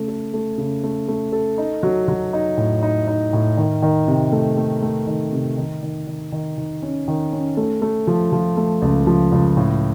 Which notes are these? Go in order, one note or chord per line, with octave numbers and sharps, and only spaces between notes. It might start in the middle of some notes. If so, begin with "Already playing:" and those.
Already playing: C#3 A3
A4
A3
C#3
A3
A3
A4
D#4
F#3
F#3
D#4
A2
D#4
D#4
A2
D#3
D#3
C3
A3
A3
A3
D#3
C3
D#3
D#3
D#3
D#3
D#3
C#4
D#3
C#4
A3
A3
F3
F3
A3
C#2
F3
C#2
A2